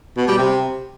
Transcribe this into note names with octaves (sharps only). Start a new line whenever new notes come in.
B2
G3
C3